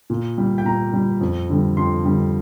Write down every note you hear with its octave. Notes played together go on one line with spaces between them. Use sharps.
A#2
G3
G5
A#2 A#5
G3
F2
D3 G3
F2 C6
D3 G3